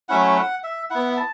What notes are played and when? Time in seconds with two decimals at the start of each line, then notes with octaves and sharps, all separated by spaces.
0.09 F#3 A3 C#4 E4 F#5
0.37 F#5
0.64 E5
0.90 B3 E4 F#5
1.17 A5